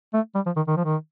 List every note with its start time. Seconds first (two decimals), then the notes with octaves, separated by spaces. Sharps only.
0.14 A3
0.35 G3
0.46 F3
0.56 D#3
0.68 D#3
0.77 F3
0.85 D#3